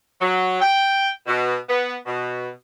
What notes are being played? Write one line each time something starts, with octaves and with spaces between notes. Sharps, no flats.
F#3
G5
B2
B3
B2